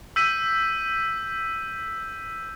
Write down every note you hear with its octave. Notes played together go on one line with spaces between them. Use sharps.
E6 G6 B6 D#7